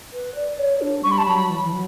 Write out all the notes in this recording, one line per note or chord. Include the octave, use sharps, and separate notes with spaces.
B4
D5
C#5
D4
G3 C#6
B5
A5
F#3 B5
E3
E3
F#3